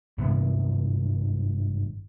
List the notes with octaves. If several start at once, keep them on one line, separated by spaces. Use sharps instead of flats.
G#1 G2 C3 B3